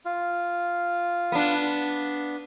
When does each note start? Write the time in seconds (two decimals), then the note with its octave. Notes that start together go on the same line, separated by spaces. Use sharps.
0.05 F4
1.32 B3 D4